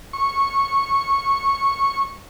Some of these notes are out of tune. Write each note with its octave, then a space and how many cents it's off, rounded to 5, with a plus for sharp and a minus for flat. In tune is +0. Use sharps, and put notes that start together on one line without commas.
C#6 -10